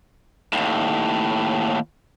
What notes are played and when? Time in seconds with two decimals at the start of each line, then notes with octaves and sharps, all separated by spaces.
0.53 D#2 A2